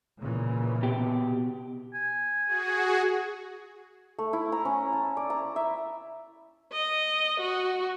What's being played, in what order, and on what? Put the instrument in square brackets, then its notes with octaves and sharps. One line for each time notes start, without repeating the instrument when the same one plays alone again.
[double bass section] A#2 C#3 E3
[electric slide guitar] B2 G4
[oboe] G#5
[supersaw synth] F#4 G#4
[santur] A3
E4
A#5
C#4
A5
D5
A#5
E5
[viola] D#5
F#4